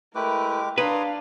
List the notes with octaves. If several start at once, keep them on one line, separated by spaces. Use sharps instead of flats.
G#3 A3 E4 G4 A#4 B4 D6
D4 B4 C#5 F5 A#5 C6 D#6